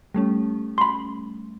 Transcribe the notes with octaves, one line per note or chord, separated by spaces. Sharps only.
G3 A3 C#4
B5 C6